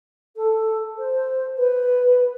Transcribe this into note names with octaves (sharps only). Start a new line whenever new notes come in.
A4
C5
B4